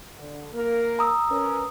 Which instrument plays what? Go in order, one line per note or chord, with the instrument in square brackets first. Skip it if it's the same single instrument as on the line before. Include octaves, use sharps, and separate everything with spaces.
[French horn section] D3
A#3 A#4
[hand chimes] A#5 D#6 E6
[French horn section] C#4 A#4 B4